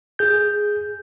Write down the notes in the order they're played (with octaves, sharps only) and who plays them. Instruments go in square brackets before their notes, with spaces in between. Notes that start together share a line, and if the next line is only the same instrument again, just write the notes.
[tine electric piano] G#4 G6